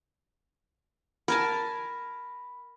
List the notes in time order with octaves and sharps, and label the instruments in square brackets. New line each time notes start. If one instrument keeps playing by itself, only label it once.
[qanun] A#4 G#5 A5 [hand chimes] B5